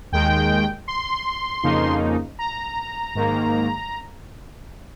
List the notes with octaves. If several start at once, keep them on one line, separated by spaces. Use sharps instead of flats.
D#2 D#3 G#3 G5
C6
F2 C#3 F3 A#3 D#4
A#5
G#2 D#3 A#3